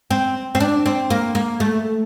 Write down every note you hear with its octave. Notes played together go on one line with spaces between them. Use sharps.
C4
C4
D4
C4
A#3
A#3
A3